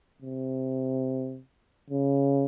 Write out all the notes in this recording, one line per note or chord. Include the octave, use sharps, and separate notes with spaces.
C3
C#3